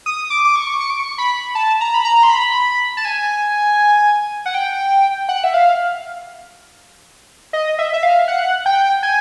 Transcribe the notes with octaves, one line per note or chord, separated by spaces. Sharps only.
D#6
D6
D6
C#6
C#6
D6
C#6
B5
A5
A#5
B5
A#5
C6
B5
A5
G#5
F#5
G5
F#5
E5
F5
D#5
E5
E5
F5
F#5
G5
G#5